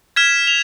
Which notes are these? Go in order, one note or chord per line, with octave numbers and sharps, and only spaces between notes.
F6 G#6 B6 E7
F7